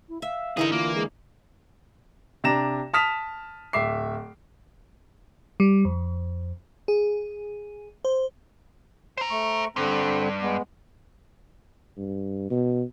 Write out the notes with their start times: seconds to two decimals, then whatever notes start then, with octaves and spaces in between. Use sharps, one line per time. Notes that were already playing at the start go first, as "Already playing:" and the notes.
0.09 E4
0.22 E5 F5
0.57 D3 E3 D#4 E4 G#4 A#4
0.72 A#3 F4
0.95 G#3
2.44 C3 D4 A#5 A#6 E7
2.94 A5 D#6 F6 B6 E7 F7
3.73 D1 E5 D6 C7
5.60 G3
5.85 F2
6.88 G#4
8.05 C5
9.18 C5 A#5
9.30 A3 C#6
9.76 G2 D3 C4
10.42 G#3 B3
11.97 G2
12.50 B2